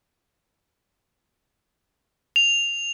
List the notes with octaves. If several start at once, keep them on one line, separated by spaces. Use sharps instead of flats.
F7